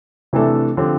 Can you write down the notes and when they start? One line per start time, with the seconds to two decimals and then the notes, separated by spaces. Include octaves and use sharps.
0.33 C3 E3 A3 D4 A4
0.77 D3 F3 C4 G4